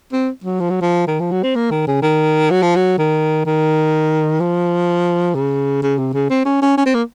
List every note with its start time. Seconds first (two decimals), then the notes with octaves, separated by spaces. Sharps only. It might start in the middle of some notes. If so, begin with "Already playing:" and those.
0.12 C4
0.44 F#3
0.60 F3
0.70 F#3
0.81 F3
1.07 D#3
1.20 F3
1.31 F#3
1.43 C4
1.55 A#3
1.70 D#3
1.87 C#3
2.02 D#3
2.50 F#3
2.62 F3
2.76 F#3
2.98 D#3
3.45 D#3
4.40 F3
5.35 C#3
5.82 C#3
5.98 C3
6.13 C#3
6.30 C4
6.45 C#4
6.62 C#4
6.77 C#4
6.86 C4
6.94 A#3